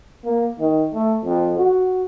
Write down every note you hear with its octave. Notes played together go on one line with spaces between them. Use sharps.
A#3
D#3
A3
F2
F#4